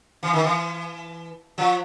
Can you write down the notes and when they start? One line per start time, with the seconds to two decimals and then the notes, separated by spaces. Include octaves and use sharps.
0.23 E3
0.34 D#3
0.44 E3
1.58 F3